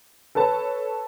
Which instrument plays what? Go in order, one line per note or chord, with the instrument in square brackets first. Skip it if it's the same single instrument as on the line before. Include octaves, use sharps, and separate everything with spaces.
[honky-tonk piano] A4 B4 C#5 A5